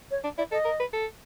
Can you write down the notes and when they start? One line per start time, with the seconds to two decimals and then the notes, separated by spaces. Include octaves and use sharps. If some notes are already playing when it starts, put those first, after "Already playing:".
0.11 C#5
0.24 D4
0.38 E4 D5
0.51 A4 D#5
0.65 A#4
0.80 B4
0.93 A4